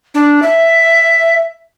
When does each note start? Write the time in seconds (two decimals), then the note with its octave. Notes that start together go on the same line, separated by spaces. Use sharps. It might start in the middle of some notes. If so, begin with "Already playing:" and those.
0.14 D4
0.42 E5